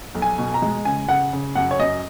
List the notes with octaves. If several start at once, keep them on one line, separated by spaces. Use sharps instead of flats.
B1
G#5
B2
A#5
G#3
C#3 G#5
C#3 F#5
C#3
F#2 F#5
C#5
F#2 D#5